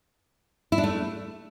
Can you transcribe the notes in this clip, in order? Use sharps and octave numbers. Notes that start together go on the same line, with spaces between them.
E4
D4
A3